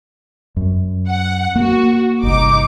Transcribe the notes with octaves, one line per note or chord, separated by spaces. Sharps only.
F#2
F#5
A#3 F#4
G1 C2 D#4 D6